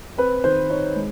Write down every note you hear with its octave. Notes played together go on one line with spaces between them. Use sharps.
C4 B4
D#3 C5
D#4 C#5
G#3